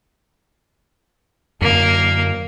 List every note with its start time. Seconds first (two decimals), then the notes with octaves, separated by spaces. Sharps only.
1.62 F#2 D3 A#3